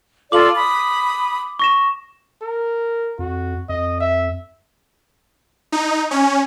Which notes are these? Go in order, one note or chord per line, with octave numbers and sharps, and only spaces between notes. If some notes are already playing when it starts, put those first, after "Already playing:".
F4 A4 D5 D6 F#7
B5 D#6
C#6 A#6 E7
A#4
F2 F#4
F2 D#5
E5
D#4
C#4